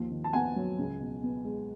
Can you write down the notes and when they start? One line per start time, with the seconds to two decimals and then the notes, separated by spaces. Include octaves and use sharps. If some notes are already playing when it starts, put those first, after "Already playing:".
Already playing: D#2 F3
0.11 D#3
0.24 A5
0.33 B3 F#5 G#5
0.56 F#3
0.78 C#2
1.00 B2
1.23 B3
1.45 G#3